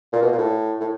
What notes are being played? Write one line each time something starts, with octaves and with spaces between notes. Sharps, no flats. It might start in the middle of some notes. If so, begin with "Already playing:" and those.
A#2
B2
A#2
A2
A2